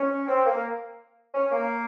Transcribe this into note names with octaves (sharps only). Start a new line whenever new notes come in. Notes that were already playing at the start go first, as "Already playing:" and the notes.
Already playing: C#4
C4
A#3
C#4
A#3